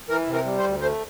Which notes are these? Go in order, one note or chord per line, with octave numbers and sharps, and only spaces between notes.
E3 A#4
C3
A#4
G3
C5
D2
A3 C5